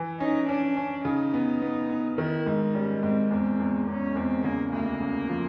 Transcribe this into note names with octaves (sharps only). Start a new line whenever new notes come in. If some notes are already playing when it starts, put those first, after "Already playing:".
Already playing: E3
C#4 D#4
C#4 D4
C#4
C#3 D#4
B3
B3
B3
D#3 E4
G#2 D#4
G3 C#4
G#2 C4
E2 C4
E2
E2 C#4
E2 C4
C#3 A#3
D2 A#3
C#3
F3